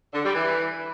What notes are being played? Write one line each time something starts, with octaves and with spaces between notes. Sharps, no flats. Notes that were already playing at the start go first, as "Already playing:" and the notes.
D3
G3
E3